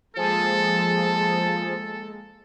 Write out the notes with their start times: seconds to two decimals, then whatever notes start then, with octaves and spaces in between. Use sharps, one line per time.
0.16 F3 G#3 A#3 G#4 A4 A5